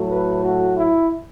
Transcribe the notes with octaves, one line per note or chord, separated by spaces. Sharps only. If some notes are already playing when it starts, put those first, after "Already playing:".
Already playing: A2 F#3 A3
B4
F#4
E4